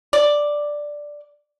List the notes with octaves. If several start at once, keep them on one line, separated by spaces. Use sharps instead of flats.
D5